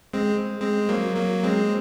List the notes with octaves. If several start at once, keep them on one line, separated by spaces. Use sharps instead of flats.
G#3 C4
G#3 C4
F#3 A#3
F#3 A#3
G#3 C4